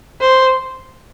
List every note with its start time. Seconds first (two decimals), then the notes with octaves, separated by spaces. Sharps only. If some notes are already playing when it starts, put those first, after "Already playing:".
0.20 C5